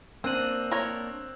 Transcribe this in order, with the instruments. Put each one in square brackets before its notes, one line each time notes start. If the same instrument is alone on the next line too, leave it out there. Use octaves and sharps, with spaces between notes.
[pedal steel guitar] A#3 D4 [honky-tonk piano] C4 D#7 [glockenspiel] E6 F#6 F#7
[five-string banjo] A#4 C#5